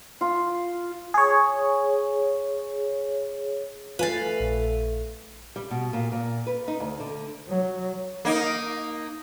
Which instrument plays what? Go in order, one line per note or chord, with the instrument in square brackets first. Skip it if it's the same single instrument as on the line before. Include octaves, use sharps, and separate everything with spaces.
[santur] F4
[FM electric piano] G#4 C#5
[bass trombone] A3 [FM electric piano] F4 G#5 A6 [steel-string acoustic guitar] B4 F5
[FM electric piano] A#1
[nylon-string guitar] G3
B2
A#2
A#2
B4
D#4
D2
D3
[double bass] F#3
[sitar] A#3 D#4